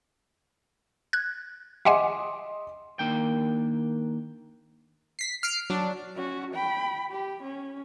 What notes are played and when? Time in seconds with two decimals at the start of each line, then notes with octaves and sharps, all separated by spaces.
1.13 F#6 G#6
1.85 D#5 E5 F#5 G#5 C6 D6
2.99 D#3 A#3 D4 G5
5.19 B6 C7
5.43 F6 C7 D7
5.70 F#3 D4
6.16 C#4 F#4
6.54 G5 B5
7.11 G4
7.43 C#4